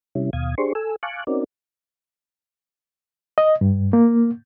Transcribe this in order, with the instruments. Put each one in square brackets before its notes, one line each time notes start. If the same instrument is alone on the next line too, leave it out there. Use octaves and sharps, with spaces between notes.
[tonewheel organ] C3 G3 C#4 E4
D#2 B2 F5 D#6 G#6
D4 G4 G#4 C5 C6 C#6
A4 G#5 E6
F5 G#5 A5 C#6 D6 F#6
C4 C#4 D#4 F#4 A#4 D5
[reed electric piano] D#5
G2
A#3